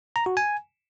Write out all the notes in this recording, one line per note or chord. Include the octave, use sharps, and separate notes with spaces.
A#5
F#4
G#5